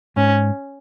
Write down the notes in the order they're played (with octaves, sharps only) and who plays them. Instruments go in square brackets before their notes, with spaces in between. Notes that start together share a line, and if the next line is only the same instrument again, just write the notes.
[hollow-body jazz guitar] G#2 [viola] C#4